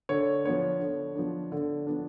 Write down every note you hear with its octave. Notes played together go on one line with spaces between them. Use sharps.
D3 C#5
F3 B3 D4 C#5
D3
F3 B3 D4
D3
F3 B3 D4